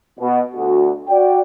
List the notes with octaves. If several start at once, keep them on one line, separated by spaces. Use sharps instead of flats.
B2
D2 F#4
F#4 D5 G5